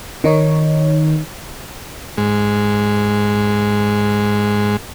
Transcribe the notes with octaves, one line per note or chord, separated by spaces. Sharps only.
D#3 D#4 C#5
G#2 G#3